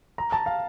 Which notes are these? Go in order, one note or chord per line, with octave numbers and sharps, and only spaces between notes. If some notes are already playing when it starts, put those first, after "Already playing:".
A#5
A5
F5